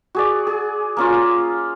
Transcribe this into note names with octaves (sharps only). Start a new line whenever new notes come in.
F#4 G#4 D5
G#4
A#3 C#4 F4